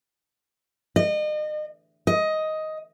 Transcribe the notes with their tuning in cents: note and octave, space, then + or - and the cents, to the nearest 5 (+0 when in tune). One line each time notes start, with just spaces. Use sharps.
D#5 -35
D#5 +10